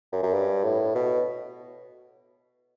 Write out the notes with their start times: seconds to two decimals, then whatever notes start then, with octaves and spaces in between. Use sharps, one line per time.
0.13 F#2
0.23 F#2
0.33 G2
0.64 A2
0.95 B2